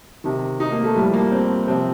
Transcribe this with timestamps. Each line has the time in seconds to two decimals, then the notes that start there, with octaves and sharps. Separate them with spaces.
0.24 C3 D#3
0.60 D#4
0.72 A#3
0.84 A3
0.96 A2 F3 G3
1.13 A#3
1.32 C4
1.67 C3 F3 C4